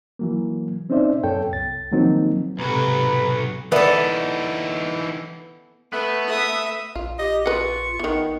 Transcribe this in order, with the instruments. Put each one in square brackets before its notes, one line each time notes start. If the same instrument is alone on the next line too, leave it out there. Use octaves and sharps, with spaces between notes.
[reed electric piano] E3 F#3 A#3
C4 C#4 D#4 C5 D5 E5
F#2 B3 A4 C#5 G5
C2 A6
D#3 F3 F#3 A#3 C4 D#4
[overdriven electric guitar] B1 F#4 [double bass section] G#2 C3 [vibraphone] A4 A#5 [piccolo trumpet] B4
[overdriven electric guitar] E3 D#4 [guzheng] B3 A4 [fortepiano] B4 D5 E5
[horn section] A3 [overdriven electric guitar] B3 [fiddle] B4
[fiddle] B4 D#6 [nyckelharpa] E5
[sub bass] A#1 [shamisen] F4
[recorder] G4 [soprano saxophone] D#5
[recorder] F4 [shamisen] B4 F#5 [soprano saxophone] C#6
[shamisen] D#3 E3 [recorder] B3